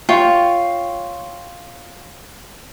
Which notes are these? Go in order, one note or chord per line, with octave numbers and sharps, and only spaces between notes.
F4 C#5 G5 C#6